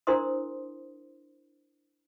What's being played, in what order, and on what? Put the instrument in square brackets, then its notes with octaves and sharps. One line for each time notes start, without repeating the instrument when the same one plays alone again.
[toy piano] D4 E4 A#4 C5 C6 D#6